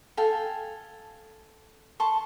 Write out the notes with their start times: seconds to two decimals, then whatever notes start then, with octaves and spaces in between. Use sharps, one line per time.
0.17 A4 F5 G5 G#5
2.00 A5 C6 C#6